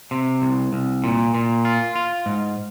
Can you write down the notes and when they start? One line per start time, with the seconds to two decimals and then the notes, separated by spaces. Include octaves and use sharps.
0.11 C3
0.42 C2
0.73 C2
1.04 A#2
1.35 A#2
1.65 F4
1.96 F4
2.26 G#2